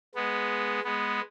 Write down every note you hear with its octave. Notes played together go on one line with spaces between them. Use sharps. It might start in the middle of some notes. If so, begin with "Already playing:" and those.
G#3 B3
G#3 B3